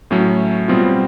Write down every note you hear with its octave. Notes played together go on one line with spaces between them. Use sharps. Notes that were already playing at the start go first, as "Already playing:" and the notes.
A2 F#3 A3 C#4
B2 G3 C4 F4